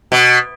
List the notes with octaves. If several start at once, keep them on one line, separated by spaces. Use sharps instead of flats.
B2